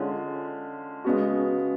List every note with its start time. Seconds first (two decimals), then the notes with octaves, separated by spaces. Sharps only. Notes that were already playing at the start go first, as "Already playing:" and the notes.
Already playing: D3 G#3 C#4 F4
1.05 C#3 G#3 B3 F#4